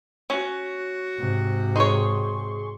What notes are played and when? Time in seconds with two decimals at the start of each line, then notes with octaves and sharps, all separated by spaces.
0.30 C#4 F#4
1.19 G#2 C3
1.76 D#4 G#4 C#5 C6 C#6